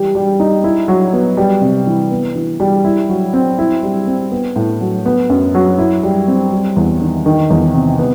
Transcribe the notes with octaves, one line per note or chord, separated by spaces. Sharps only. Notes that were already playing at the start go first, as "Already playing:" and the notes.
Already playing: E3 G3 G4
G3
D#4
E4
F#3
B3
G3
C3
E3
B3
E3
G3
E4
F#3
C4
E4
G3
C4
B3
A2
F#3
B3
F#2
F#3
E4
G3
C4
G3
E2
D#3
D#3
E2
C3
B3